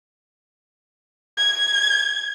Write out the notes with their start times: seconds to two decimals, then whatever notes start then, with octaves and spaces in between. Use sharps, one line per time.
1.38 G#6